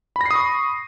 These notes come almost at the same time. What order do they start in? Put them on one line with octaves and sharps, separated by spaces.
B5 A#6 C7 D#6 C#6